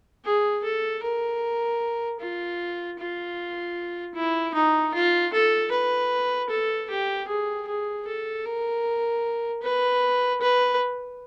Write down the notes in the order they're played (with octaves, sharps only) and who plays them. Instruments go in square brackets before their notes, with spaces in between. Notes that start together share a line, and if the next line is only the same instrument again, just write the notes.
[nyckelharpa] G#4
A4
A#4
F4
F4
E4
D#4
F4
A4
B4
A4
G4
G#4
G#4
A4
A#4
B4
B4